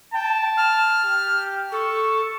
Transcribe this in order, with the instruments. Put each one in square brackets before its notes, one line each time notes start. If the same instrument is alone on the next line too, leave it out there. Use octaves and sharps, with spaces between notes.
[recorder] G5 [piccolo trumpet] A5
[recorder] F6
[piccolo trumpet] G4
[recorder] A4 [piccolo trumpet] C#6